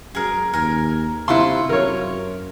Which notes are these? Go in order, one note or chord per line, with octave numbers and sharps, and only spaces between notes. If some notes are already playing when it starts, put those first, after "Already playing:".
F#2 G#4 A#4
D#2 A#4 G#5
C3 E4 F4 E5 F#5 C6
F#2 A#4 C#5